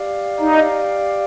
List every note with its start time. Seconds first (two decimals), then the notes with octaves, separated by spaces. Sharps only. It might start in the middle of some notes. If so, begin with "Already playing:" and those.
Already playing: G4 D5 F5
0.40 D#4